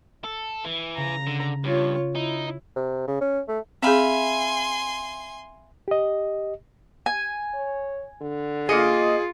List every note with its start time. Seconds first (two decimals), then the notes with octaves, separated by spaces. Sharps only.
0.24 A4
0.64 E3
0.97 C#3 A#5
1.27 D3
1.64 G2 F4 C#5
2.15 D#4 E4
2.76 C3
3.08 C#3
3.21 C#4
3.48 A3
3.82 C4 G#4 E5 F5 G#5 B5 C6
5.88 G4 D#5
7.06 G#5
7.54 C#5
8.21 D3
8.69 A#3 F4 G#4 D#5 C#7